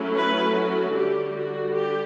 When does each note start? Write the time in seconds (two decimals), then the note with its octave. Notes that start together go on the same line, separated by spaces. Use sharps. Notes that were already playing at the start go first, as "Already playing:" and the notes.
Already playing: F#3 A3 C#4 E4
0.14 B4
0.55 F#4
0.94 D3 G3 D4 G4
1.34 F#4
1.75 G4